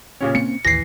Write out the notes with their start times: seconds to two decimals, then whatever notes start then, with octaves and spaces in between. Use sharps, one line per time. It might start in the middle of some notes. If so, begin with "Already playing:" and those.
0.20 A#2 C#3 C#4
0.35 A#3 C4 C#4 C#7
0.65 A1 D#2 E3 A#6 C7